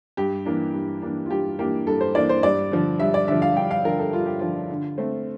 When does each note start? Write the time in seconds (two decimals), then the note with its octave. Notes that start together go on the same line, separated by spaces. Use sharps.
0.17 G2 G4
0.45 E3 A#3 D4
0.74 G2
1.02 E3 A#3 D4
1.26 F4
1.31 G2 G4
1.58 E3 A#3 D4 G4
1.87 G2 A4
2.01 C5
2.15 E3 A#3 D4 D5
2.29 C5
2.43 G2 D5
2.71 D3 F3
3.00 G2 E5
3.14 D5
3.28 D3 F3 E5
3.42 F5
3.57 G2 G5
3.71 F5
3.84 D3 F3 A#4
3.99 A4
4.13 G2 F4
4.26 G4
4.39 D3 F3 F4
4.70 D3
4.98 A3 C4